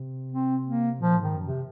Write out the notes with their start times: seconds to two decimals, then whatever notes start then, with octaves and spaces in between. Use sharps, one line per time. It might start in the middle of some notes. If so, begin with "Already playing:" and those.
Already playing: C3
0.32 C4
0.66 A#3
1.00 A#2 F3
1.18 G#2 D#3
1.34 F#2
1.46 C3